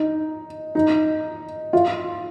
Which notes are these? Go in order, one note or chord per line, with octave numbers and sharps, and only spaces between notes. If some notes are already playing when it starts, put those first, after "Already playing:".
Already playing: D#4
D#4
F4